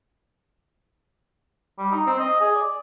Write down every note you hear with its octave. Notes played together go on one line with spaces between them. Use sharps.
G3
D#4
C4
D#5
G#4
D5